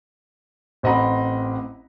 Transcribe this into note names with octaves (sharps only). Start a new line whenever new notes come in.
A1 C4 D#5 F#5 A#5 B5